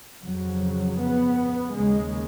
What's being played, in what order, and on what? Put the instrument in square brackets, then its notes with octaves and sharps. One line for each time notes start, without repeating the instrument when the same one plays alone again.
[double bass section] F2 C#3 F#3
B3
D#2 C#3 G#3